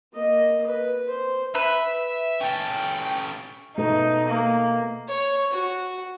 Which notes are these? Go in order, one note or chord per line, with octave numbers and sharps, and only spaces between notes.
A#3 D#5
B4
C5
B4 E5
C#4 A4 G5
B2 A3 B3 D#4
A#3
C#5
F#4